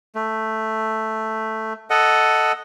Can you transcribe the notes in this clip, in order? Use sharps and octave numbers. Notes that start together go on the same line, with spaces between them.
A3
A4 D#5 F#5